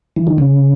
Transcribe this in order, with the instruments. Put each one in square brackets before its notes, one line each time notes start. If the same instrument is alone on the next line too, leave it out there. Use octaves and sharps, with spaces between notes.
[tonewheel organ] E3
D#3
C#3